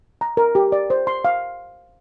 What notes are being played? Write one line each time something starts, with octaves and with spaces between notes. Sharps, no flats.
A#5
A#4
G4
D5
C5
C6
F5